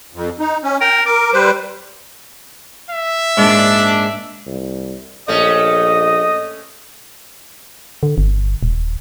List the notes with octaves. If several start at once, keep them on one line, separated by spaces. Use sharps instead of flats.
F2
D#4
C#4
A#4 G5
A#4 D6
G3 B4 C5
E5
A#1 G#2 D4
C2
A#1 A3 C#4 D#5
D3
G1
D#1